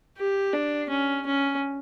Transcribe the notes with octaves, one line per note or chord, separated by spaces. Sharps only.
G4
D4
C#4
C#4